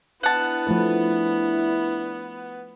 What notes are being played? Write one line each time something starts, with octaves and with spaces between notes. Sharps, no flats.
B3 D4 E4 F#5 A5
F3 A3 B4